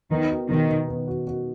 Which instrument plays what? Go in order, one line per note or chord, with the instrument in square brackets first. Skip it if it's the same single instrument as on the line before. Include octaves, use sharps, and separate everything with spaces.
[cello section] D#3 [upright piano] B3
[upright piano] F#4
[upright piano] B2 [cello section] D#3
[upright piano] B2
B3
F#4
F#4